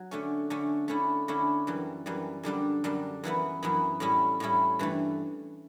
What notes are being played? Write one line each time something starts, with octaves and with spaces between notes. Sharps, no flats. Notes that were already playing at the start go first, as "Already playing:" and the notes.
Already playing: F#3
D3 A3 C#4
D3 A3 C#4
D3 A3 C#4 E4
D3 A3 C#4 E4
F#2 E3 G3
F#2 E3 G3
F#2 D3 G3 D4
F#2 D3 G3 D4
F#2 E3 B3 E4
F#2 E3 B3 E4
A2 G3 C#4 E4
A2 G3 C#4 E4
G2 E3 A3